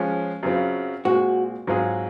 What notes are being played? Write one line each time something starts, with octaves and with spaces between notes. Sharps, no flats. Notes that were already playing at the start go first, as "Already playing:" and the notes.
Already playing: F3 G#3 C#4
F#2 C#3 F#3 C4 F4
A#2 G#3 C4 F#4
G#2 F#3 C4 F4 G#4